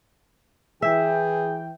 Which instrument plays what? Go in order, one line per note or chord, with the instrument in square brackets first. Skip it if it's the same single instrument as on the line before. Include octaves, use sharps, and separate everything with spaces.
[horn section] E3 G5 [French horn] G#4 [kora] E5